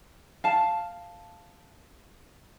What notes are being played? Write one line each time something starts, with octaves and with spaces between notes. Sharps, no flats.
F5 A5